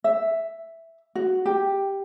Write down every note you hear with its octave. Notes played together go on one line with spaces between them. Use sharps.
E5
F#4
G4